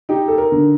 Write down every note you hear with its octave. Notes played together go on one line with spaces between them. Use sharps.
D#4 G4
A4
A#4
D3